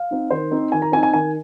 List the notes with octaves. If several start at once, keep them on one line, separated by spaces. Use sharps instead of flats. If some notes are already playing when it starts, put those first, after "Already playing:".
Already playing: F5
C4 D#4
D#3 C5
C4 D#4
D#3 G#5
A#5
C4 D#4 G#5
G#5
D#3 G#5